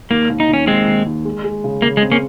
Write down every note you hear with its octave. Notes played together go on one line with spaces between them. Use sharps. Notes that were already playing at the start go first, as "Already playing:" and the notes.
D#2 A#3
D#2
D#4
D#3
C#4
D#2 G#3 C4
D#2
D#2
G#3
G#3
C#3
C#3 A#3
G#3
C4
A#3 C#4